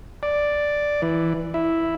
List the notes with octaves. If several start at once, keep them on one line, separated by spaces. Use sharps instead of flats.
D5
E3
E4